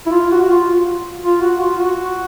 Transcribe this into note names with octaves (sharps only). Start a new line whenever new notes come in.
E4
F4
F#4
F#4
F4
F4
F#4
F4
F#4